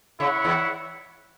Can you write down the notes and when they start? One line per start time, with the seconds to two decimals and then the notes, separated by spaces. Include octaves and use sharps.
0.20 C#3 E4 C#5 F#5
0.45 E2 E3